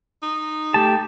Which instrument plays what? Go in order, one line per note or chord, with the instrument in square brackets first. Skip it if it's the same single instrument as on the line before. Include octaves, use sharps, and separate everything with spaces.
[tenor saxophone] D#4
[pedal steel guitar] A3 A5 [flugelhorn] G4